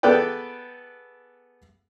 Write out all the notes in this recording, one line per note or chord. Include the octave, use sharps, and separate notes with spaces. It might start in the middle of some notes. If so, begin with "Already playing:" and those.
B3 G#4 A4 B4 D5 G5